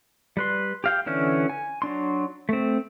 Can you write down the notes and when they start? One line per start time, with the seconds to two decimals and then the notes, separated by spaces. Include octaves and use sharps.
0.37 G3 B4 C6
0.84 G4 F5 G5
1.06 D3 E3 C#4 F6
1.50 G#5
1.82 F#3 D4 C6
2.49 A3 C4